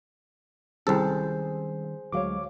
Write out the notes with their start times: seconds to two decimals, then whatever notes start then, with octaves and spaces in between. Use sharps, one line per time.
0.87 C2 D#3 G3 C#4 G#4 A4 C5
2.12 D2 F#3 G#3 C#5 F5 D6